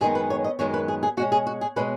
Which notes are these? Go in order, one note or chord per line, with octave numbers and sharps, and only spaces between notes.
F#2 D#3 G#3 B3 G#4
B4
C#5
D#5
F#2 D#3 G#3 B3 C#5
B4
G#4
G#4
B2 G#3 C#4 F#4
G#4
F#4
G#4
B2 G#3 C#4 B4